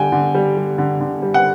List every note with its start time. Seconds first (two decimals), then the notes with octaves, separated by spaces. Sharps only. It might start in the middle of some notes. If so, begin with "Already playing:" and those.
Already playing: D3 G3 G5 G#5
0.12 D3
0.35 G3
0.57 G3
0.78 D3
1.00 D3
1.22 G3
1.34 F#5